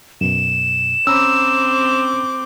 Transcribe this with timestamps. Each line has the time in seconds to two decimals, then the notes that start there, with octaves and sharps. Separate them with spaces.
0.21 F#2 B2 E7
1.07 C4 C#4 A#5 B5 D6 E6